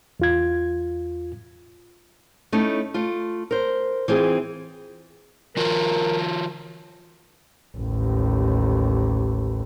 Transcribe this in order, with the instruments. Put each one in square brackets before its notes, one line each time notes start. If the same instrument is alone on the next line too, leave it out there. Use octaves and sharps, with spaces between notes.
[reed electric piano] E2 F4 G#6
[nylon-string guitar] A3 C#4 D#4 E4
A3 F4
A#4 C5
E3 C4 F4 G#4
[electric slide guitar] E3 F4 F#4 [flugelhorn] A#4
[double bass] A1 D#2